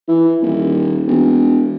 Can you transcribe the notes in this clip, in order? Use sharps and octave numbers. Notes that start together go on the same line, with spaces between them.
E3
D#1
E1